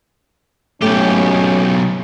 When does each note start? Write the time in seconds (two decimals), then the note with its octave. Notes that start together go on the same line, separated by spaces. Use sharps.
0.82 B1 A3 C#4 G4